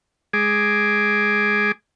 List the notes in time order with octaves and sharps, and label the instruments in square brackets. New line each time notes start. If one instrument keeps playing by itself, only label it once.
[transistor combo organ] G#3 G#4 D6